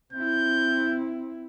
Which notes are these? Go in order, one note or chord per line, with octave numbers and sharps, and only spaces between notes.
C4 E4 G6